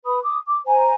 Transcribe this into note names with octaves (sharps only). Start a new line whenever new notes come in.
B4 B5 D#6
D6 D#6
D6
C5 G#5 A#5